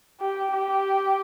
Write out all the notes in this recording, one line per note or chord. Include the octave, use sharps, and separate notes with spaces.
G4
G4